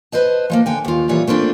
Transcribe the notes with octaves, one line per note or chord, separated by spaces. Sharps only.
B4 C5 D#5 A5
F3 G#3 A#3
D3 G5 G#5
D#2 F4
A#2 E3 G3 F4 C#5
A3 A#3 C4 D4 F4